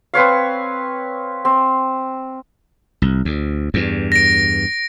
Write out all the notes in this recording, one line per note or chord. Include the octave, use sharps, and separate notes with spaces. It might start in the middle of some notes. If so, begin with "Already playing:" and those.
C4 B4 C#5 F5
C4
C2
D2
E2 G2
A#6 D7